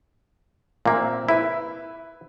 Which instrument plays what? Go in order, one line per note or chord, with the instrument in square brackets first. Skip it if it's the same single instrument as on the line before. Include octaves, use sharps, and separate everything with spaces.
[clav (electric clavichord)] A#2 A#3 [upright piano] C4 E5
[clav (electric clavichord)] E4 [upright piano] B4 E5